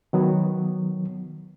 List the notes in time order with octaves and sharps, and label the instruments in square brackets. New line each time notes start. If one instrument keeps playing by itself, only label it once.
[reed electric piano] D#3 F#3 B3